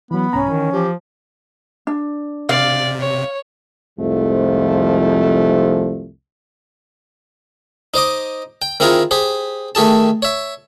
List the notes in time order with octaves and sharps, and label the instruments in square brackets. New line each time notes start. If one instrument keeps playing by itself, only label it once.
[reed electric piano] E3 F#3 [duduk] B3 [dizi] B5
[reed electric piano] C2 G#2 A#5 [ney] C#4
[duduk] D#3 [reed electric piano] E3
[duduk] F3 [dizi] G4
[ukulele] D4
[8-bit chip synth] C3 [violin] D5 [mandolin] F5
[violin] C#5
[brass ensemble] C2 F2 G#2 F3 A3
[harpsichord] D#4 C5 D#5 D6
G5
D#3 C4 E4 F4 G#4 A#5
G4 G#4 C5
D#3 A3 G4 G#4 A5
C#5 E5